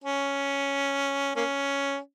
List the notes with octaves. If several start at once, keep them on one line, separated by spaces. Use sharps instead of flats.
C#4
A#3 C#4